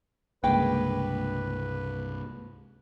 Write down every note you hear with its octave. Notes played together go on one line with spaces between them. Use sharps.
C2 G2 C#3 G#3 A#3 B4 G5